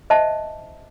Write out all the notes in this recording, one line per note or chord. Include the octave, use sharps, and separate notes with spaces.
C5 D#5 E5 A5